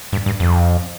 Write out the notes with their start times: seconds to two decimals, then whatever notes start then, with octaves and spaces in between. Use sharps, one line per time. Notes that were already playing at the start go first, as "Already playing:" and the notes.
0.13 G2
0.26 G2
0.40 F2